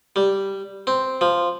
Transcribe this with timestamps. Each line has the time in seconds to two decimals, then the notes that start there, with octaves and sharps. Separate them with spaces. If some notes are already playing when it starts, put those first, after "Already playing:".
0.16 G3
0.87 C4
1.21 F3